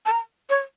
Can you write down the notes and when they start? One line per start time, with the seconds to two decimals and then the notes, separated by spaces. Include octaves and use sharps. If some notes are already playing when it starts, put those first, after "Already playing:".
0.06 A5
0.11 A#5
0.50 C#5